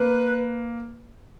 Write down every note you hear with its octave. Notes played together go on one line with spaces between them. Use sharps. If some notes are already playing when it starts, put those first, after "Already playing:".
Already playing: A#3 B4